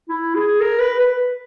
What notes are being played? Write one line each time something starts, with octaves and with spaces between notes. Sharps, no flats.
E4
G#4
A#4
B4
B4